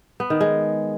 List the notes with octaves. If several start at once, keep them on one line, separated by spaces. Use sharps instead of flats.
B3
D#3
G#3